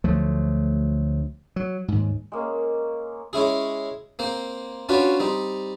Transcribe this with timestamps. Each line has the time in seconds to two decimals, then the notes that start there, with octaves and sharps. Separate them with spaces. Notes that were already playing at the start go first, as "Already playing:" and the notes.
0.04 D2 F3 F#3 A3
1.56 F#3
1.88 D#2 G#2
2.32 G#3 A#3 C#4
3.33 G#3 C#4 E4 G#4
4.19 A#3 C4 C5
4.89 C#4 D4 F4 F#4 B4 C#5
5.20 G3 C4 D#4